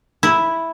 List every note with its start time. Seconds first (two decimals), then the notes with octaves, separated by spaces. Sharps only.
0.23 E4